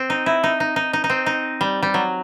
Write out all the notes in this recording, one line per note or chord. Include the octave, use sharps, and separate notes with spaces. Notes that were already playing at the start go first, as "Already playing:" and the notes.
Already playing: C4
D#4
E4
D#4
D#4
D#4
D#4
D#4
C4
D#4
G3
G3
F#3